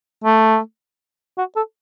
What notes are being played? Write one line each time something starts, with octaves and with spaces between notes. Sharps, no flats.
A3
F#4
A4